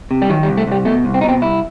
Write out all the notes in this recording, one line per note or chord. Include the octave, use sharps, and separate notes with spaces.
C3
G3
D#3 F#3
G3
C2
A3
C2 G3
B2 A3
C2
C4
B2 D#4
C4
C2 E4